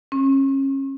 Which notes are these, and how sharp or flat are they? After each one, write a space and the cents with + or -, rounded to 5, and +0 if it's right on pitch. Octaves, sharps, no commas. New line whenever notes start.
C#4 -30